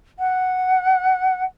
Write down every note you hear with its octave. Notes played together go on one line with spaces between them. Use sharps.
F#5